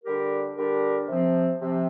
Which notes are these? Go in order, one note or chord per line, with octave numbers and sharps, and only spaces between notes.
D3 G3 D4 G4 A#4
D3 G3 D4 G4 A#4
C3 F3 C4
C3 F3 C4